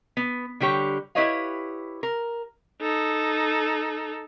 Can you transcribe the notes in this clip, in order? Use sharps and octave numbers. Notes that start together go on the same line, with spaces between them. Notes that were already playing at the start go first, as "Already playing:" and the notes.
B3
D3 G3 G4 C#5
E4 G4 B4 C#5 D#5 F5
A#4
D#4 A4